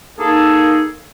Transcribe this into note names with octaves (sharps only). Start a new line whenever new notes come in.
A#3 D#4 G#4 A4